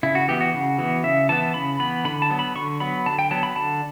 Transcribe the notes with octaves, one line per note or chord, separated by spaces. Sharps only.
C#3 E4
F#4
E3 B3 G4
F#4
C#3
E3 B3
C#3 E5
E3 B3 A5
C#3 B5
E3 B3 B5
D3 B5
A5
F#3 B3
B5
D3 C#6
F#3 B3 B5
D3 A5
G5
F#3 B3 A5
B5
D3 A5